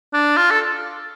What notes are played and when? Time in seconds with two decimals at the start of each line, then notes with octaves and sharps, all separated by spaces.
0.13 D4
0.37 F4
0.51 A4